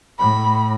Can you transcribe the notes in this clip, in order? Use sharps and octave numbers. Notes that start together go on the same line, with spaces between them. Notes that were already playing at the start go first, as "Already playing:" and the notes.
A2 B5